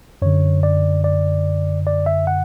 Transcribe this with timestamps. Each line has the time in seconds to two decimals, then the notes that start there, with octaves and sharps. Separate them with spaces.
0.22 F#2 D3 C#5
0.63 D5
1.04 D5
1.87 D5
2.06 E5
2.27 F#5